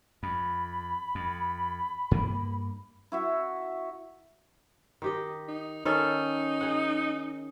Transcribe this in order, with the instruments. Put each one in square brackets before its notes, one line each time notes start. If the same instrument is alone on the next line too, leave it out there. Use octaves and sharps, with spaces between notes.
[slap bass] F2 [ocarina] B5
[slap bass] F2
G2 A#3
[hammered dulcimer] E4 F#4 E5
[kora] D#3 G4 D#5
[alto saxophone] D#4
[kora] D#3 C#4 A4 [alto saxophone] D#4
[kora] G#4 F#5